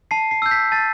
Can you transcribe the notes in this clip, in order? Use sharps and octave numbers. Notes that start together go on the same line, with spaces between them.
A5 C7
C7
E6 G6
B6
A5 A6